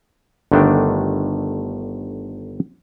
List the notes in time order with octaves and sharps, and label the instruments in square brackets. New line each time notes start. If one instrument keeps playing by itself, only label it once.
[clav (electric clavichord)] G1 D3 D#3 A3 D4 G5